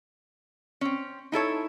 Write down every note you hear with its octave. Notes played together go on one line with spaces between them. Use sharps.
C4 C#4
D#4 E4 A4 C#5